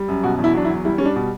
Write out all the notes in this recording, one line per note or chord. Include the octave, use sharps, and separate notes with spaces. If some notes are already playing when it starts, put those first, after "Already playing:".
Already playing: G3
F#2
B2 F#4
E2
E4
F#3 D4
E4
E2
G3 E4
G3 C#4
D4
B2